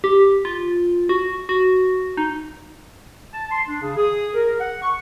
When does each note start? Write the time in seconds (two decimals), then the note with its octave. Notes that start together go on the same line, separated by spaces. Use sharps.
0.04 G4
0.45 F4
1.09 F#4
1.49 F#4
2.17 D#4
3.33 A5
3.51 C6
3.68 D4
3.82 C#3
3.97 G#4
4.35 A#4
4.60 F#5
4.82 C#6